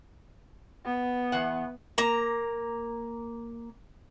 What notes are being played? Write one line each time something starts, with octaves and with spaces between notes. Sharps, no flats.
B3
E2 F#5
A#3 A#5